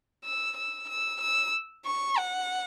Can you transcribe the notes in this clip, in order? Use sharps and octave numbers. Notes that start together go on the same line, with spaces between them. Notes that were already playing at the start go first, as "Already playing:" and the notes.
E6
E6
E6
E6
C#6
F#5